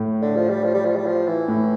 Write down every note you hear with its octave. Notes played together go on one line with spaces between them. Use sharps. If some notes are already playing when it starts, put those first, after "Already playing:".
Already playing: A2
D3
F3
G3
F3
G3
F3
G3
F3
E3
A2